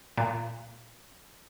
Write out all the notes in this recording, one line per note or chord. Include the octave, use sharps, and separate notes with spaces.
A#2